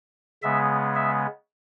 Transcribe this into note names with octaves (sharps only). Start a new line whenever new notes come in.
C#3 G#3 B3 E5
E5